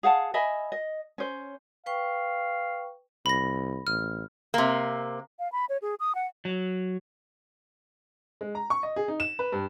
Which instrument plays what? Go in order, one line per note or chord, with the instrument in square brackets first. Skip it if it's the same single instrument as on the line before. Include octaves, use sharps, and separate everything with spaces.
[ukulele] G#4 F5 F#5 A5
D#5 E5 G#5 B5
D#5
C#4 C5
[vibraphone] B4 G5 C#6 [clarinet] F5
[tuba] C2 [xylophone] B5 A#6
[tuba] A1 [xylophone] F6
[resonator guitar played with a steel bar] C3 A#3
[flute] F5
B5
C#5
G#4
D#6
F#5
[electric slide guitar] F#3
[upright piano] G#3
A#5
C#6
D#5
G#4
D#4
E7
B4
G2